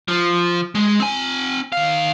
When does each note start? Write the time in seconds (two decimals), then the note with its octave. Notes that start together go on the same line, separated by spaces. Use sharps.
0.08 F3
0.75 G#3
1.00 C4 G#5
1.72 D#3 F5